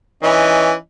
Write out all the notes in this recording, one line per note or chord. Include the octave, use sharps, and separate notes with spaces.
E3 C#4 D#4